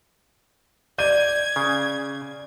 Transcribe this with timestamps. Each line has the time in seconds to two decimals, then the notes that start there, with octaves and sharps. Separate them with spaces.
0.98 D5 G6 G#6 D#7
1.56 C#3